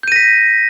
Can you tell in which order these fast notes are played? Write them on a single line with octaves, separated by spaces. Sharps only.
G6 D#7 A#6 B6